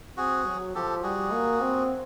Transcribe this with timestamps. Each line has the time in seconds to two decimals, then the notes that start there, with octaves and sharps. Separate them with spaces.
0.17 C4 F#4 G#4
0.47 F#3
0.75 F3 G4 A4
1.03 G3 F#4 G#4
1.32 A#3
1.61 C4